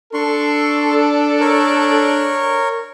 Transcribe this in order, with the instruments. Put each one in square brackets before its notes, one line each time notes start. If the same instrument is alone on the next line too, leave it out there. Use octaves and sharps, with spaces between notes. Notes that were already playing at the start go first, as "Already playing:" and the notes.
[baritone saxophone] D4 [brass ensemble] A4 [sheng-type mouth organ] C6 C#6
[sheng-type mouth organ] A#4 C#5